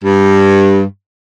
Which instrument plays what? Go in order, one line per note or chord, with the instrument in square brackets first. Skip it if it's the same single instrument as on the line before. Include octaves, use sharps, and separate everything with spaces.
[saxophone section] G2